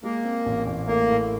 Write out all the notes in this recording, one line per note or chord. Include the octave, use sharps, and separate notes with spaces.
G#3 A#3
C4
A1
A1
A3 A#3
A2